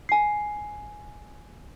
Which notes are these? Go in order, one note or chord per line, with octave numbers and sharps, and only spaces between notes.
G#5 C7